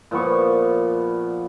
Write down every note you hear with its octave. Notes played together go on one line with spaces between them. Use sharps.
A#2 F3 B3 C#6